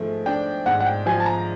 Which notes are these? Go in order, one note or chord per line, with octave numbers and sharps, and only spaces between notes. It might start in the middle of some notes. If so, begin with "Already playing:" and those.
Already playing: G#2 F3 A3
D4 G5
G#2 F#5
F#5
G5
F3 G#5
A5
A#5